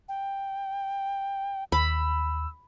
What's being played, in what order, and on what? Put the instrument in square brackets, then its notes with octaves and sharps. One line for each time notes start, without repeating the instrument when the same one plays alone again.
[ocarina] G5
[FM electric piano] D#2 [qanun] B5 [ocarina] E6